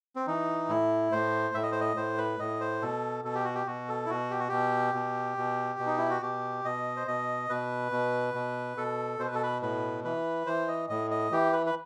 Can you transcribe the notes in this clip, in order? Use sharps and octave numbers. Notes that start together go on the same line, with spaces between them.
C4
E3 D#4
A2 E4
A2 C5
A2 E5
D#5
C5
D#5
A2 C5
B4
A2 D#5
C5
B2 A4
B2 A4
G4
F#4
G4
B2 F#4
A4
E4
B2 F#4
G4
F#4
B2 G4
B2
B2
B2
D#4
E4
F#4
B2 G4
B2 D#5
C5
B2 D#5
B2 B4
B2
B2
B2 A4
B2 C5
B4
A4
B4
A2 B4
E3 B4
E3 C5
D#5
A2 D#5
D#5
E3 G4
B4
B4